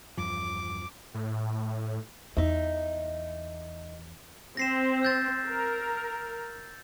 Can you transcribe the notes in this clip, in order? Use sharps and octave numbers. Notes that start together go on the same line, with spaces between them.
E2 G2 F3 D6
A2
E2 D#4 E5
C4 A#6 C7 E7
E6 G6 A6
A#4